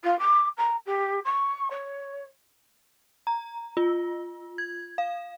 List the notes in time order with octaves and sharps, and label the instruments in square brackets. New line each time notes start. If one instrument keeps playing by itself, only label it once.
[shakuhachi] F4
D6
A#5
G4
C#6
C#5
[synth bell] A#5
F4
G#6
F5